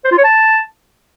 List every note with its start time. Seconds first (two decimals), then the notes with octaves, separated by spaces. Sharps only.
0.05 C5
0.11 F4
0.18 C#5
0.24 A5